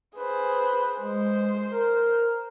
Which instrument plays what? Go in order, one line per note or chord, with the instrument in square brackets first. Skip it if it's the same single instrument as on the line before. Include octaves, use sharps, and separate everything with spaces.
[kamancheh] G#4 C5 [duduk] B4
[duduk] G#3 [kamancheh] C5
[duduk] A#4